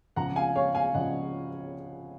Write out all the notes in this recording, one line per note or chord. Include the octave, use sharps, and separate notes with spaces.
C#2 C#3 F3 F#5 A#5
F5 G#5
C#5 F5
F5 G#5
C#2 C#3 F3 D#5 F#5